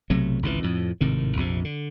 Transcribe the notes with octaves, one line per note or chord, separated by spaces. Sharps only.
B1 C3 F#3 A3
G#1 C#2 C3 E3
F2 A2
G#1 A2 C3 D#3
A#1 F2 C3
D3